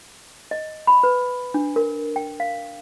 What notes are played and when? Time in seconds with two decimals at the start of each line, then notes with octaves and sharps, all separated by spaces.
0.51 D#5
0.87 B5
1.03 B4
1.54 D4
1.76 A#4
2.16 G5
2.40 F5